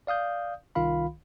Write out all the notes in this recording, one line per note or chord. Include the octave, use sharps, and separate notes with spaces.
D5 F5 D#6 G6
C2 D#3 F4 F5 B5